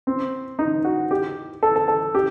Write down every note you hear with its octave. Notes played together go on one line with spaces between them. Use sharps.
C4
D#4
F#4
G4
A4
A4
A4
G4